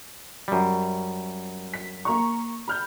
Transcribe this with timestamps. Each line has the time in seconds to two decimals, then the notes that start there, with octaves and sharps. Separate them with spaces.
0.48 F#2 G3
1.74 B6
2.05 A#3 A#5 C#6
2.68 B5 F6 G6